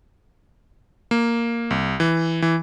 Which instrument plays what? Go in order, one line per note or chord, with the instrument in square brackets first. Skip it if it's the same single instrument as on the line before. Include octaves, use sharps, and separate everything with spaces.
[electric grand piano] A#3
C2
E3
E3